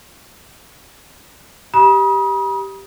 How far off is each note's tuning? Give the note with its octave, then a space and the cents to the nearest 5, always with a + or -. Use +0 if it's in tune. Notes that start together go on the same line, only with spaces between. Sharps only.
G4 +0 B5 -45 D#6 +15